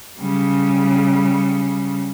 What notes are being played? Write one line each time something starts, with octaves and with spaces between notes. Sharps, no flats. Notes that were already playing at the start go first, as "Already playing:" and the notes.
C#3 G3